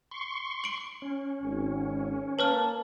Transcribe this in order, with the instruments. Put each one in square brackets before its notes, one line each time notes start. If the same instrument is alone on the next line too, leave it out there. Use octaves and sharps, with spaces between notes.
[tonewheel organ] C6 C#6
[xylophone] D7 F#7
[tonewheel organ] C#4
[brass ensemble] G#1
[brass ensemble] A#3 A5 [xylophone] B4 C#5 F6